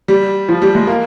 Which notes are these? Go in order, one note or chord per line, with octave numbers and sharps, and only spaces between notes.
G3
F3
G3
G#3
A#3